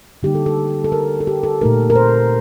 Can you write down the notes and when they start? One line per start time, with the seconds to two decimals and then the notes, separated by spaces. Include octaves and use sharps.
0.23 D3 G3 A#3 D#4 G4
0.35 A4
0.46 A4
0.84 A4
0.92 A#4
1.21 A4
1.27 G4
1.44 A4
1.61 A#2 A3 D#4 A#4
1.90 A#4
1.96 C5